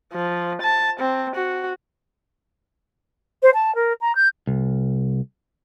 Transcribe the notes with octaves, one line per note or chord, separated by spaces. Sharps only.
F3
A5
C4
F#4
C5
A5
A#4
A#5
G6
C2